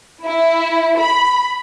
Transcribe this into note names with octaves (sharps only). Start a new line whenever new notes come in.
E4
B5